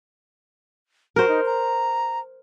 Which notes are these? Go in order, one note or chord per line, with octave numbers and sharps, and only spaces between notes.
F#4 A#4 C5
D#4
A#5